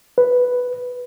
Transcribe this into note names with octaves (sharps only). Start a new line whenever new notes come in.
B4